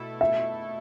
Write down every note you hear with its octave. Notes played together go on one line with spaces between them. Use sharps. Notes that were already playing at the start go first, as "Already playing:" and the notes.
Already playing: B2 A3 E4 A4
E5